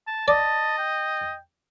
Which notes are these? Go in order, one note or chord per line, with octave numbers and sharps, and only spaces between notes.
A5
D5 D#5 A5
G5